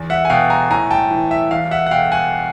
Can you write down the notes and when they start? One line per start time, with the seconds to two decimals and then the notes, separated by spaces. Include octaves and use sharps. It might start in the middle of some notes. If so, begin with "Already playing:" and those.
Already playing: E2
0.10 E5 F#5
0.25 G#5
0.30 B2 F5 G5
0.50 G#5 A#5
0.70 A2 G#5 A#5
0.91 G5 A5
1.11 E3
1.31 E5
1.51 E2 F5
1.71 E5 F#5
1.86 F#5
1.91 B2 F5 G5
2.12 F#5 G#5